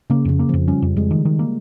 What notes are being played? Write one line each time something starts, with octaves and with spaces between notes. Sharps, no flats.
C#3 A#3
F2 C#3
A#3
F3
F2
G3 C#4
F2
F2 G#3
D#3
D#3
A#3